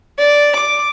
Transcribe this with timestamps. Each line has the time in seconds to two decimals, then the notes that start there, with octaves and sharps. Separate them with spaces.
0.19 D5
0.56 D6